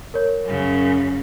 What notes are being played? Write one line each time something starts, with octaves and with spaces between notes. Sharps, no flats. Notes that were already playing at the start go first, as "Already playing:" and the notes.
A#4 C#5
F#2 C#3